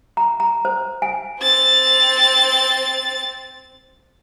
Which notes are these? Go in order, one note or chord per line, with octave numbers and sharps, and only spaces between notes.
A#5
A#5
C5
G#5
C4 A6